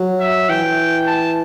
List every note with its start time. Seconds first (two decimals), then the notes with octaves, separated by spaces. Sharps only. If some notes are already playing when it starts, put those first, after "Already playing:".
Already playing: F#3
0.20 E5
0.49 E3 G5
1.07 A5